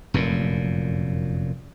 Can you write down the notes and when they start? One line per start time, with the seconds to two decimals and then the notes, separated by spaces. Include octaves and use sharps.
0.14 F1 F#2 A#2